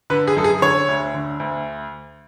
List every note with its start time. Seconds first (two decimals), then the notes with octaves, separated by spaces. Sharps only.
0.10 D3 B4
0.27 G#4
0.36 F#2 A4
0.44 G#4
0.62 D3 C#5
0.89 D2
1.14 D3
1.40 D2